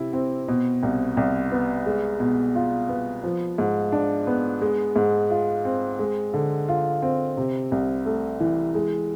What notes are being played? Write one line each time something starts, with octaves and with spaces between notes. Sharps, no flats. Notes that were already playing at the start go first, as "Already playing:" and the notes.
Already playing: C3 E4
C4
B2
C2
C2
B3
G#3
B2
F4
B3
F3
G#2
D4
B3
G#3
G#2
F4
C4
G#3
D3
F4
C4
C3
C2
A3
E3
G#3